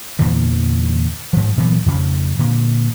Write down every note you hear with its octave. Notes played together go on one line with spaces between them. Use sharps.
E2 A#2 D3 E3
G#2 F3
A#2 E3 F#3 B3
F2 C#3 F3
A#2 D3